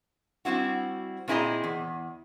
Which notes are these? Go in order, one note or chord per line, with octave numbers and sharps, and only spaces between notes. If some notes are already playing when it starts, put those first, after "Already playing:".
G3 G#3 C4 E4 F#4
A#2 C4 E4 G#4 D#5 A#5
E2